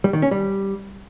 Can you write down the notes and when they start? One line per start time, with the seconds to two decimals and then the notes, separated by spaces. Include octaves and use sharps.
0.04 G3
0.13 D#3
0.22 C#4
0.31 G3